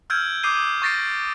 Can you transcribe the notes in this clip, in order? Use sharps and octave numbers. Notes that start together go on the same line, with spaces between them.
E6 F6 G6 G#6 D7
D6 D#6 G6 C7 D#7 G7
C#6 G6 A6 A#6 C7 D7